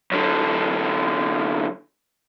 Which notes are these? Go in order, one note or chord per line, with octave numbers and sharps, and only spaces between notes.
F#2 D3